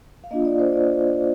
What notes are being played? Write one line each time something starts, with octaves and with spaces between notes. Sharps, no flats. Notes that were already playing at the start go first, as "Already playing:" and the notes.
F5
A#3 D4 F4 D#5
D5
C5
D5